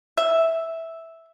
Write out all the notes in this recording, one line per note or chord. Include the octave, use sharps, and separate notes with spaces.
E5